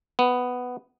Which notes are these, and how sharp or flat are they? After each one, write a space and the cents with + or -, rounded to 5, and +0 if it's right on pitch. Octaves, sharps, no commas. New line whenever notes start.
B3 +5